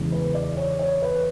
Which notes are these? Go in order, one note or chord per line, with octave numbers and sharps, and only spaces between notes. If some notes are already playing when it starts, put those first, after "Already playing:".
Already playing: E2 C#3 G#3
B4
D5
C#5
C#5
B4